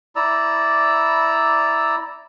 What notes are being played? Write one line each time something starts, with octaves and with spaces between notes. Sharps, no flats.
E4 D5 A#5 E6